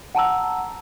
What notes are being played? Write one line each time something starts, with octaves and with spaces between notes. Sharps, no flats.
F#5 A5 A#5 E6